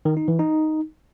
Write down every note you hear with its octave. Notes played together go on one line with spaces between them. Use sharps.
D#3
D#4
E3
D#4